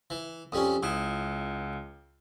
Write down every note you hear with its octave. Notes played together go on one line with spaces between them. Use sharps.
E3
F2 G3 C#4 D#6
C#2 E4 D#6